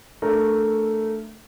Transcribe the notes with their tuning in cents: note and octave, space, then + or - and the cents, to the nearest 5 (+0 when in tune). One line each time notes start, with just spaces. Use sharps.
A3 +0 D4 +0 A#4 +0